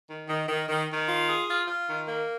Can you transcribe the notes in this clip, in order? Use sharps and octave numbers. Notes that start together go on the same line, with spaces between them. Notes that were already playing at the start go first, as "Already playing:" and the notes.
D#3
D#3
D#3
D#3
D#3
F4
G#4
F4
F4
D#3
A#3